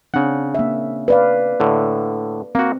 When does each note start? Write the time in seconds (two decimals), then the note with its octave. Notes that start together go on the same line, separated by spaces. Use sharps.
0.14 C#3 C4 D4 F#5
0.55 A#3 E5
1.08 B4 D5 F5
1.60 A2 D3
2.55 A#3 C4 F#4